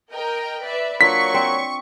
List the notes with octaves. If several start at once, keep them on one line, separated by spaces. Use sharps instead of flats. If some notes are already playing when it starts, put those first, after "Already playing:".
A#4 D#5 G5
B4 D5 E5
F#3 A#3 D4 F4 C#5 C#6 B6
C4 D5